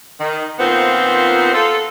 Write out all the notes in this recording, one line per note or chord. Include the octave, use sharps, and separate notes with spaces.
D#3
A#2 D#3 B3 C4 F4 C5
F4 A4